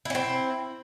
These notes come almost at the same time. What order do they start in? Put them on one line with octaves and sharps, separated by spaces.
E4 C#4 C4